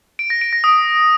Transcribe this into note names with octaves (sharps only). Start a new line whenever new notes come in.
D7
A#6
D7
A#6
D#6